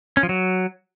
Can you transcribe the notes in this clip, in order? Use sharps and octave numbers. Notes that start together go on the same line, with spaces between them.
C#4
F3
F#3